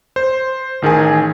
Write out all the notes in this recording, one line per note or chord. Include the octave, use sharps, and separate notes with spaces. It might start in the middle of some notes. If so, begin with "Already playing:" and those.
C5
A1 D#3 G#4 G#5